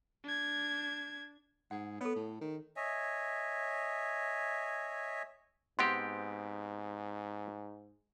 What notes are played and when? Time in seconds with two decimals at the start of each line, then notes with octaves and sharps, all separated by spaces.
0.24 D4 G#6
1.71 G#2 F#5
2.01 B3 A4 C#5
2.16 A2
2.41 D#3
2.76 C#5 D#5 E5 G#5
5.79 G#2 B3 C4 G4 F#5 C6